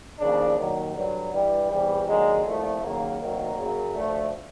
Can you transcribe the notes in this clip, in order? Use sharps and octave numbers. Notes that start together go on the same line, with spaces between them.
D#2 C#3 F3 D4
D#2 D#3 F#3
G2 D3 F#3
G2 E3 G3
E2 C3 E3 G3
D#2 D3 F#3 G#3
C2 A#2 F3 A3
D#2 C#3 F#3 A#3
D2 C3 D#3 F#3
F#2 C#3 F#3
D2 D3 F3 A3